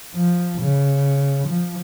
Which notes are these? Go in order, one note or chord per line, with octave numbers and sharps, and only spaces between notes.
F3
C#3
F3